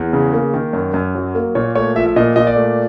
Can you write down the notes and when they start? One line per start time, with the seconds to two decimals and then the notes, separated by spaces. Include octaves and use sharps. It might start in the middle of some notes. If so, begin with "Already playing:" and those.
Already playing: E2
0.13 C#3
0.33 A#3
0.54 D#3
0.73 F#2
0.94 F#2
1.15 F#3
1.35 A#3
1.55 A#2 C#5
1.75 A3 C#5
1.96 F3 E5
2.06 E5
2.16 A#2 D#5
2.36 A#2 D#5
2.47 D5
2.56 A3